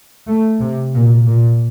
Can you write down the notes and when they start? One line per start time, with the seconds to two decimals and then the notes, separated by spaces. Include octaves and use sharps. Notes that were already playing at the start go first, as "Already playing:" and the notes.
0.27 A3
0.60 C3
0.95 A#2
1.28 A#2